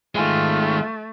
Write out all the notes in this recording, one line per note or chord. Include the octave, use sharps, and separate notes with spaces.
D#3 G#3 A3 F4